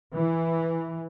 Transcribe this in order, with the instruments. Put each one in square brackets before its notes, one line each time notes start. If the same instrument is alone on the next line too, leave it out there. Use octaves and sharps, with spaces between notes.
[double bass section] E3